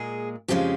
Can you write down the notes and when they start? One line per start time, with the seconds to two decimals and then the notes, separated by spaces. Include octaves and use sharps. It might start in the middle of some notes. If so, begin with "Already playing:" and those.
Already playing: A#2 G#3 G#4
0.48 F2 C#3 F3 G#3 G4